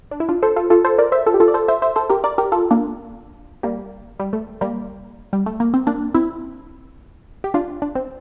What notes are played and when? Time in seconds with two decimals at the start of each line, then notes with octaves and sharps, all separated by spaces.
0.11 D4
0.20 E4
0.29 D4 F4
0.43 A4 C5
0.56 F4 A4
0.70 F4 A4
0.85 A4 C5
0.98 A#4 D5
1.12 C5 E5
1.26 F4 A4
1.34 G4
1.40 F4 A4
1.48 D5
1.54 A4 C5
1.68 C5 E5
1.82 C5 E5
1.96 A4 C5
2.10 G4 A#4
2.24 A#4 D5
2.38 G4 A#4
2.52 F4 A4
2.71 A#3 D4
3.63 G3 A#3
4.20 G3
4.33 A3
4.61 G3 A#3
5.33 G3
5.46 A3
5.60 A#3
5.74 C4
5.87 A#3 D4
6.14 C4 E4
7.44 G4
7.54 D4 F4
7.82 D4
7.95 C4